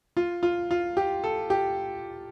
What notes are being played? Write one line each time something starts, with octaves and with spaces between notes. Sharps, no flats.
F4
F4
F4
G4
A4
G4